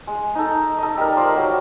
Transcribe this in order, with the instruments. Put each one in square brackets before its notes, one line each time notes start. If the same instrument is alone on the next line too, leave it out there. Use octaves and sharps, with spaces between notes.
[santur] G#3
D#4 A4
A4 D#5
G3 A#4
F4 C5 D5
F#3 G3